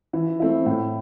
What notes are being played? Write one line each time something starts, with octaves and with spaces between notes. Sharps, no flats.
E3
A3 C4 E4
A2